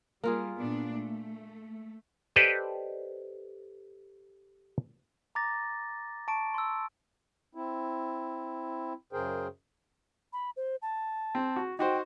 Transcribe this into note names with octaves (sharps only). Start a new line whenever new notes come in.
G3 A#3 F4 G#4
A#2 B3 D4
A3
G4 A4 B4 C5 D5 D#5
A#5 D6 A6 A#6
A5 C#6 D7
C6 E6
C4 E4
F#2 C#3 G#4 A#4 C5 G5
B5
C5
A5
C4
F#4
D#4 F#4 C5 G5